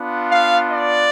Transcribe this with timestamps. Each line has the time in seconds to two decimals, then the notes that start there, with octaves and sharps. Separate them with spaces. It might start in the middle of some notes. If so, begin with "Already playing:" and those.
Already playing: B3 D4 F4
0.30 F5
0.71 D5